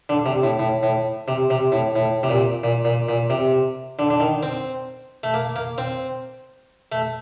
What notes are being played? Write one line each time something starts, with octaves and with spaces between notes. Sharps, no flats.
D3
C3
A2
A2
A2
C3
C3
A2
A2
C3
A#2
A#2
A#2
A#2
C3
D3
D3
D#3
C4
A3
A#3
A#3
C4
A3